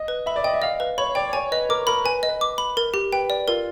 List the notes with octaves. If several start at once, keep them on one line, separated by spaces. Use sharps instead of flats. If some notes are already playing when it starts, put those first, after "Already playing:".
Already playing: D#5
B4
E5 B5
D5
D#5 G5
E5
D#5 F5
B4 F5
C#5 B5
D5 G5
C#5 G#5
B4 D#5
A#4 D6
A#4 B5
B4 G#5
D#5
B4
D6
B5
A#4
G4
B4 G5
D5
F4 A#4